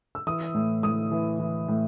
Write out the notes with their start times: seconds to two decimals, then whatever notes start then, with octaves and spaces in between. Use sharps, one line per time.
0.15 E6
0.27 E3 D#6
0.54 A2
0.83 A2 D#6
1.11 E3
1.40 E3
1.68 A2